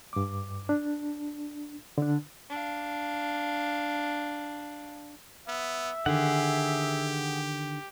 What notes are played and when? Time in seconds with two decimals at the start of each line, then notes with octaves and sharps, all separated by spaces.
0.13 G2 D6
0.69 D4
1.98 D3 D4
2.50 D4 F5
5.48 B3 E5
6.06 D3 D#3 G4 G#4 F#5